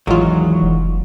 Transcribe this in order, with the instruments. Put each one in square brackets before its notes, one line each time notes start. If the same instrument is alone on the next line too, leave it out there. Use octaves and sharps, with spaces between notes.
[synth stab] A1 F4 [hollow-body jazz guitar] E2 D#3 G#3 [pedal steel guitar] F#3
[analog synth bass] F1